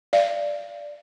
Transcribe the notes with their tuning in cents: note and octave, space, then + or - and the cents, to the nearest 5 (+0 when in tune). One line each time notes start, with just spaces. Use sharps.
D5 +0 F5 -30